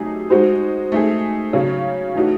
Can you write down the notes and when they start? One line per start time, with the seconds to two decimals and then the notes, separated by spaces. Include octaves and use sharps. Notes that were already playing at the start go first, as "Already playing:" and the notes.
Already playing: C3 F#3 A3 D#4 G#4
0.30 G#3 D#4 F#4 C5
0.92 A3 D#4 G#4
1.53 C#3 F#3 C#4
2.15 E3 A3 D#4 F#4